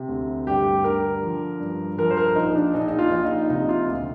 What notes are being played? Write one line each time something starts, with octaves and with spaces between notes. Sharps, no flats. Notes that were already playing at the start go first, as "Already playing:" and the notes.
Already playing: C3
D2
G2 G4
D3 A#4
F3
G2
F3 A#4
C5
A#4
A#1 D#4
D4
A#1 D#4
D#4
F4
A#1
D#4
C3 D#4
F4
D2